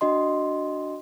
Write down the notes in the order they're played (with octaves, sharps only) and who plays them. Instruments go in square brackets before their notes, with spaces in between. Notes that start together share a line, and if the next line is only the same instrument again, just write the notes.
[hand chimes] D4 F#4 D#5 C6